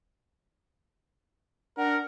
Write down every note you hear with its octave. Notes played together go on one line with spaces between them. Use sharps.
D4 A#4 F#5